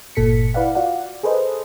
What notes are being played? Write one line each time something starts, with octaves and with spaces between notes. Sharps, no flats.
G1 A#2 A4 B6 C#7
E4 B4 D5 F5 F#5
F4 F#4 D5 F5 F#5
G#4 A4 B4 C5 D#5